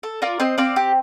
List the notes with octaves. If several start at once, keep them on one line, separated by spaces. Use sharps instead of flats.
A4
F4 A#4 D5
C4 C5 D#5
C4 D5 F5
G4